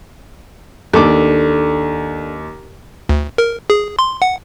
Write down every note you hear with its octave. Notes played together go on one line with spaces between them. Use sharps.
D#2 D4 A4 D6
D2
A#4
G#4
C6
F#5